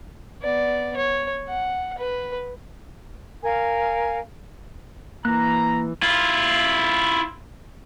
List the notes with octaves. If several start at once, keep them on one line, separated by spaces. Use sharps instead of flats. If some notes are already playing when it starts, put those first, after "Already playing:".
B3 D5
C#5
F#5
B4
A#4 F5 G#5
E3 A#3 A#5 F#6
E4 F4